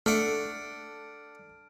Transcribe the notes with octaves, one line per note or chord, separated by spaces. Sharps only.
A3 D4 A4 F#5 F6 D7